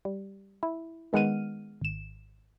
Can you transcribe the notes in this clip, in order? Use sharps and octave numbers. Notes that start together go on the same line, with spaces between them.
G3
E4
D#3 G#3 B3 F#5 F6 D#7
G#1 E7